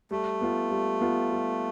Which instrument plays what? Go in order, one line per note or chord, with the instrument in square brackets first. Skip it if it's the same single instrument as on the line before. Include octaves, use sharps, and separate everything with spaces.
[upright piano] G3 [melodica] A3
[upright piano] B3 F4
G3
B3 F4
G3